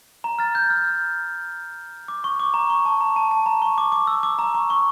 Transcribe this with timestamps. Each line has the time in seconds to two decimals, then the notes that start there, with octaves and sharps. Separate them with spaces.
0.24 A#5
0.39 F6 A6
0.55 G6
0.70 F6
2.08 D6
2.24 C#6
2.40 D6
2.54 A#5
2.70 C#6
2.85 A5
3.01 A#5
3.16 A5
3.31 A5
3.46 A#5
3.62 C#6
3.78 D6
3.92 D6
4.07 E6
4.23 D6
4.39 A#5
4.54 C#6
4.70 C#6